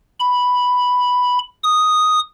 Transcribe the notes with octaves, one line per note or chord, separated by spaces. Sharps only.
B5
D#6